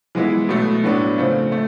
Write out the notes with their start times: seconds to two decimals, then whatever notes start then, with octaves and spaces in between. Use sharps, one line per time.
0.15 E3 G#3 B3 E4
0.49 B2 F#3 A3
0.84 A2 F#3 B3 D4
1.18 C#3 F3 A3 C4
1.52 A3